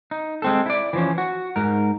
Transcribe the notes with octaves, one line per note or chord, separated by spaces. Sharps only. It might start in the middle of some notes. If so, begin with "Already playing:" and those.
D#4
G#3 C4 A4
E4 D5
E3 F3 C#4
F#4
G#2 A#4